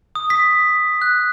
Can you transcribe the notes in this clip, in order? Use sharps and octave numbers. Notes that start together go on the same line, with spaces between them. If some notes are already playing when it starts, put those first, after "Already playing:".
D#6
B6
F#6